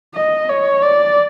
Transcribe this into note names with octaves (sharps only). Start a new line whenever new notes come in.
D#5
C#5
D5